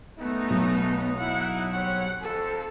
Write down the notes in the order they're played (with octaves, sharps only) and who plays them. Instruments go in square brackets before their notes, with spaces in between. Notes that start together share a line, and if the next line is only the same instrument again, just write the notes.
[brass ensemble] F#2 F#3 D#4 [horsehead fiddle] A3 B3
[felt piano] B1
[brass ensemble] D#4 E4 [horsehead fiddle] F#5
[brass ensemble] G3 C4 C#5 [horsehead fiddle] F#5
[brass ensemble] F2 [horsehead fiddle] A4